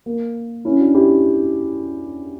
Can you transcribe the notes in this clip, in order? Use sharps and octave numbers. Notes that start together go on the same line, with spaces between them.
A#3
C#4 E4
D4 F#4
E4 G4